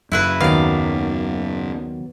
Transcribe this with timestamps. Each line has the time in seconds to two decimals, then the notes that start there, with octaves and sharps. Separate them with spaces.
0.12 F#1 F#2 E4 F#4 B4
0.40 D#2 D#3 F#3 B3 D5 F5